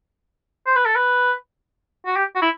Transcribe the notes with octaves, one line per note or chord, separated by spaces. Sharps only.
C5
B4
A4
B4
F#4
G4
F#4
E4